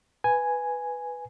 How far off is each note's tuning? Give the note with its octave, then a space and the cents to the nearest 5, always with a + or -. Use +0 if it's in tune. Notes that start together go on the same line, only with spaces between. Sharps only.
B4 +0 G#5 +0